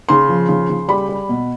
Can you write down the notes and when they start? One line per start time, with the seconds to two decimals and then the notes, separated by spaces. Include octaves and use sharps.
0.09 C#3 C6
0.29 F3
0.49 C#3
0.69 C#3
0.89 G3 B5
1.09 G3
1.29 B2